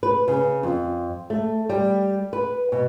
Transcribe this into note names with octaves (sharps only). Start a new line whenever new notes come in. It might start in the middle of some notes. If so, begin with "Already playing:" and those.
B4
C#3
F2
A3
G3
B4
B2